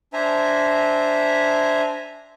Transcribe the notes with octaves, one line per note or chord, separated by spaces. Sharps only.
D4 C5 E5 G#5 A#5